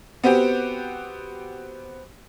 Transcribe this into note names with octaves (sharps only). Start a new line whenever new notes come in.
B3 C4 F#4 G4